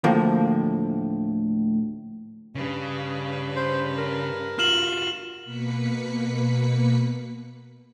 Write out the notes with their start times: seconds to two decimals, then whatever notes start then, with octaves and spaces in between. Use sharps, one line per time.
0.04 D2 A2 F3 A#3
2.55 G2 C#3 B4
3.56 C5
3.98 A#4
4.59 F4 F#4 F6 E7 F#7
5.44 B2 A#3 B4 B6 C#7